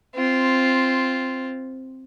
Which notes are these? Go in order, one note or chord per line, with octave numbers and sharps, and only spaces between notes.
C4 F4